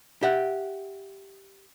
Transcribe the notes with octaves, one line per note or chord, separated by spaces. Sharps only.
G4 E5 F#5